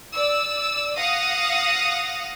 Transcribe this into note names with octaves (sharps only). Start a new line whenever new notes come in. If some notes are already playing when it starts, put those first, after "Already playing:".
D5 E6
F5 F#5 D#6 A#6